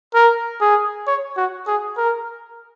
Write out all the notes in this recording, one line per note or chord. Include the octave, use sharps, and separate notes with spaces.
A#4
G#4
C#5
F#4
G#4
A#4